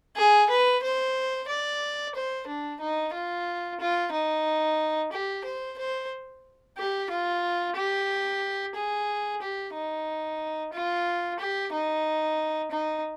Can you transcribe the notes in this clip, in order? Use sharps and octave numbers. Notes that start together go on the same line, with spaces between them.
G#4
B4
C5
D5
C5
D4
D#4
F4
F4
D#4
G4
C5
C5
G4
F4
G4
G#4
G4
D#4
F4
G4
D#4
D#4